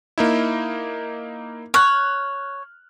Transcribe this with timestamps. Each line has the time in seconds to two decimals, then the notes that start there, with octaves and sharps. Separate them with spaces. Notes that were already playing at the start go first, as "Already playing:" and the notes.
0.18 A#3 D#4 E4
1.74 C#5 F6 F#6